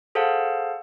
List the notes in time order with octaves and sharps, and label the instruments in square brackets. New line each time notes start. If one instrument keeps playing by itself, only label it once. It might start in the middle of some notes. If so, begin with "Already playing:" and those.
[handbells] G#4 A4 C5 F5 F#5 A5